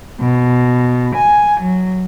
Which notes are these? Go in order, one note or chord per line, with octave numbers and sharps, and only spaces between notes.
B2
G#5
F#3